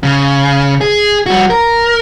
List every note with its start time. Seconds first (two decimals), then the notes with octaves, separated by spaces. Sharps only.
0.03 C#3
0.81 G#4
1.26 G3 F#4
1.50 A#4